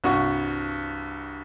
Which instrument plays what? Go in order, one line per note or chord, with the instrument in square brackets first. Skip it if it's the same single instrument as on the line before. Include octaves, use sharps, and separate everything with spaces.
[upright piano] C2 G2 F#4 C#6